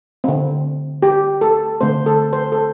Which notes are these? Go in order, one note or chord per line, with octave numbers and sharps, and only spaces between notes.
D3 C4
G4
A4
D3 A3 C4 C5
A4
C5
A4